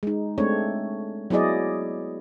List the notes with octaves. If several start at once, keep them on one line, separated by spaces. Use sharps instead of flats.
G#3 D#4
G#3 A3 C4 D4 C#5
F#3 B3 E4 G#4 D5 D#5